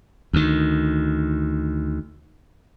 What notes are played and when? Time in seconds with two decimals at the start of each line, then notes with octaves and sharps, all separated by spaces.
0.33 D2 D#3